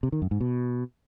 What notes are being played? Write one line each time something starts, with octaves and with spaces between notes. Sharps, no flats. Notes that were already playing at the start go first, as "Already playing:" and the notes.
C3
D#3
F#2
G#2
B2